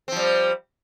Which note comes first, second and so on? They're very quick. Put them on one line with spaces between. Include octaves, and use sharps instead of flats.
C4 F3 G3